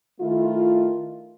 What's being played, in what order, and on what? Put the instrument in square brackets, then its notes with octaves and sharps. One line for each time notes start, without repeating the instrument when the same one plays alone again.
[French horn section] D#3 A3 E4 F4